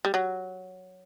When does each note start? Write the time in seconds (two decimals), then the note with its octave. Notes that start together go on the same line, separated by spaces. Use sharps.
0.05 G3
0.14 F#3